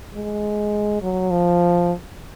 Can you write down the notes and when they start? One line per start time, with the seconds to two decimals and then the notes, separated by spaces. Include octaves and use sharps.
0.14 G#3
1.02 F#3
1.31 F3